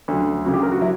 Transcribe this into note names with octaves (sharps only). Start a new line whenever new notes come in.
D2 C#3 F#3 D4
D2 C#3 F#3 F#4
G4
A#4
F#4
F#3 E4